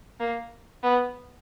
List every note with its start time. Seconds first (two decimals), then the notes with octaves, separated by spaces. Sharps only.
0.20 A#3
0.83 B3